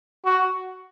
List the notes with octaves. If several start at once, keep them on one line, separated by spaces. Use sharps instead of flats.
F#4